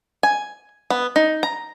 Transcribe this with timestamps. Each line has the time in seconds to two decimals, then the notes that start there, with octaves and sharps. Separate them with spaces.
0.23 G#5
0.90 B3
1.16 D#4
1.43 A#5